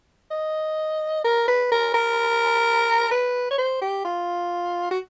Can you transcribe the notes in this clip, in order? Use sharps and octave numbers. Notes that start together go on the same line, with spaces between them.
D#5
A#4
B4
A#4
A#4
B4
C#5
C5
G4
F4
F#4